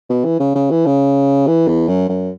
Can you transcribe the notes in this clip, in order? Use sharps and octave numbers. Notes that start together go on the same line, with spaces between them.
B2
E3
C#3
C#3
E3
C#3
E3
E2
F#2
F#2